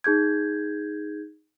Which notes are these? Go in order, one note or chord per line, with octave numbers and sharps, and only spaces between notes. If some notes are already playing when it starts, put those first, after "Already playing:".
D#4 G#4 G6 G#6